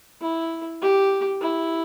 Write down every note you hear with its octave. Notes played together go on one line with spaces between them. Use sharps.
E4
G4
E4